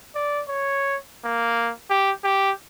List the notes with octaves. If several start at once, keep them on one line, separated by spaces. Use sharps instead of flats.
D5
C#5
A#3
G4
G4